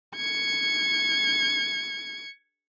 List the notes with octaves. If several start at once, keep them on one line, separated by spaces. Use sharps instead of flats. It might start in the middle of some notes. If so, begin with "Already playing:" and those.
G#6 C#7